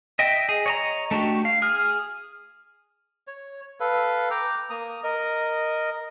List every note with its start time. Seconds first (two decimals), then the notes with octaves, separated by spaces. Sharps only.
0.19 D#5 E5 G5
0.49 G#4
0.66 C#5 D#5 A#5
1.11 A3 D4 F#4 G4
1.45 F5
1.62 G#4 F6
3.27 C#5
3.80 A4 B4 F5
4.31 G5 A#5 D6
4.70 A#3 A#5 D#6
5.04 A#4 D#5